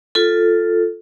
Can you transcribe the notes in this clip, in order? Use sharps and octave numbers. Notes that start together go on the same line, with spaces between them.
F4 A4